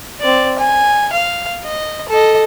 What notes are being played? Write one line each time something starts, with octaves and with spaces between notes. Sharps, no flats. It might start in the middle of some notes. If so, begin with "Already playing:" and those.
C4 D5
G#5
F5
D#5
A4 D#5